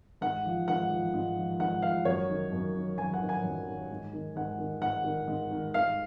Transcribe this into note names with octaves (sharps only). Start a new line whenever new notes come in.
G#2 F#5
F3
G#2 F#5
F3
G#2
F3
G#2 F#5
F3 F5
F#2 C#5
D#3
F#2
D#3
F#2 G#5
F#5
D#3
G#5
F#2
D#3
G#2
D#3
G#2 F#5
D#3
G#2 F#5
D#3
G#2
D#3
G#2 F5